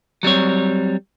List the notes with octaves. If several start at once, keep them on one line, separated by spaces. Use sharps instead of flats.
F#3 G3 C4 C#5